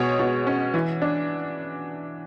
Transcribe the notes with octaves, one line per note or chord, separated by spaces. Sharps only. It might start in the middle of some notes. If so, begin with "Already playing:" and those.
Already playing: B2 G#3 C#5
B2
C#4
E3
D4